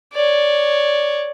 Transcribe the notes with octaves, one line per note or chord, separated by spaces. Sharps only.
C#5 D5